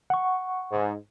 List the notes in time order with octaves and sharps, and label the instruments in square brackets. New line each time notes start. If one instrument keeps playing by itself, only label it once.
[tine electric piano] F#5 C#6
[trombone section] G#2